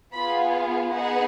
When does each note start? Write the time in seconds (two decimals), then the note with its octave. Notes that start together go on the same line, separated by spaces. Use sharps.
0.12 B3 F4 G#4 B5
0.91 B3 D#4 G#4 F#5